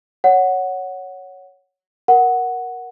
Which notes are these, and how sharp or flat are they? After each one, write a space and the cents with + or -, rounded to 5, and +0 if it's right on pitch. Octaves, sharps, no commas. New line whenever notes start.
C#5 +0 F#5 +0
A#4 +15 F#5 +0